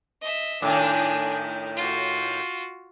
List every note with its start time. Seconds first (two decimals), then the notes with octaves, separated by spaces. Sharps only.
0.21 D#5 E5
0.62 A2 D#3 D4 G#5
1.77 F4 F#4